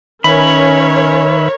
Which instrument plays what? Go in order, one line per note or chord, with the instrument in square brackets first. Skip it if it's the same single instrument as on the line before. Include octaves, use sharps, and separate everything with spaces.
[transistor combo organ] D#3 B4 E5 [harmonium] C#4 [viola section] A#4 C#5 [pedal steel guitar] B5